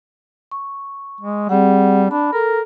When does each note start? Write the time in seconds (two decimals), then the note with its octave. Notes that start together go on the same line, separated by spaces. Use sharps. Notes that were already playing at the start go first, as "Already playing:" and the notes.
0.51 C#6
1.21 G#3
1.49 G3 C4 G#4 F#5
2.11 D4 B5
2.33 A4 A#4